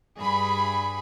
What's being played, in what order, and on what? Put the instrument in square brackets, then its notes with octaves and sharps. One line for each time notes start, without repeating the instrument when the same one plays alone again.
[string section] G2 G#4 B5